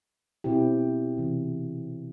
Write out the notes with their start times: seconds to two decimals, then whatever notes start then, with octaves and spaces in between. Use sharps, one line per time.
0.44 B2 C4 E4 G4
1.18 C3 E3